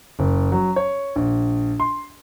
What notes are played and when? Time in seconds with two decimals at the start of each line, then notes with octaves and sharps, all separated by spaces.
0.19 F#1
0.52 F#3
0.76 C#5
1.16 A#1
1.80 C6